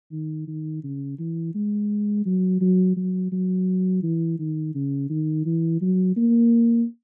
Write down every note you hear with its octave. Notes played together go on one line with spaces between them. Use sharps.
D#3
D#3
C#3
E3
G#3
F#3
F#3
F#3
F#3
E3
D#3
C#3
D#3
E3
F#3
A#3